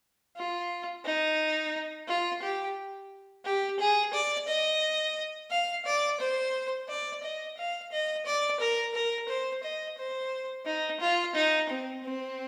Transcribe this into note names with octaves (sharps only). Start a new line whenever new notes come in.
F4
D#4
F4
G4
G4
G#4
D5
D#5
F5
D5
C5
D5
D#5
F5
D#5
D5
A#4
A#4
C5
D#5
C5
D#4
F4
D#4
C4
C4